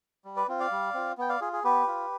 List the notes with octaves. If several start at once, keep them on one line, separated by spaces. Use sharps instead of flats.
G3
B4 D5
C4 F4
D5 F5
G3
C4 F4
B3 G5
D5 F5
F4 G#4
G#4
B3 G4 B4
F4